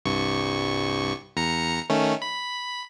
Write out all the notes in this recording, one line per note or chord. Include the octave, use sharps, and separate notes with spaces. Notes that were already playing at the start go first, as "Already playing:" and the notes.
C2 G2 C#6
E2 A#5 C#7
D#3 A3 C#4
B5